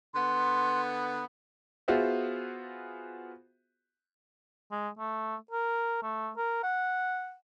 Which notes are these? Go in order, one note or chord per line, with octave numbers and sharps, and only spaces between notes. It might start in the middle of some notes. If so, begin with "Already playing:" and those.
D3 B3 C6
B3 F4 F#4 G#4 C5 E5
G#3
A3
A#4
A3
A#4
F#5